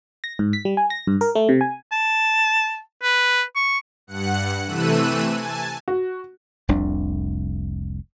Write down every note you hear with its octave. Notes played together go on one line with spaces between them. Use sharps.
A#6
G#2
B6
G3
G#5
A#6
G2
A#4
A3
C3
G#5
A5
B4
C#6
G2 F#5 F#6 C#7
C3 E3 A3 E6 F#6 D#7
G#5 A5
F#4
F1 C2 F2 D4